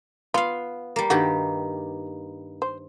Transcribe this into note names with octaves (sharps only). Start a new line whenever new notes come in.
B3 F4 F5
G3 A#3
G2 D#3 A3 A#3 F#4 G4
C5